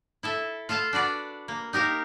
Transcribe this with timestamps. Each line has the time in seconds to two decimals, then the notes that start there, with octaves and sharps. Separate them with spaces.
0.23 E4 A4 E5
0.69 F4 A4 F5 A5
0.93 D4 F#4 B4 D5
1.48 A#3
1.73 D#4 G4 A#4 F5